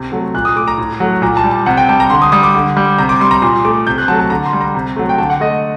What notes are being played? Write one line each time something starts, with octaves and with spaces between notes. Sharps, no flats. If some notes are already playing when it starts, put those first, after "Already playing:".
Already playing: C3 F#6
F#3 A3
A#2 F#6
D#6
A3 D6
A#5
A2
F#3 A3
A#2 A#5
A5
G3
A5
C3 F#5
G5
G3 A5
A#5
D3 C6
D#6
G3 D#6
D6
D3
G3
C3 A#5
D6
G3 C6
A#5
A#2 C6
A3 D6
C3 G6
F#6
F#3 A3 A5
A5
D3 A#5
C6
G3
A#5
C3
F#3 A3
G5
D3 A5
F#5
A3 D#5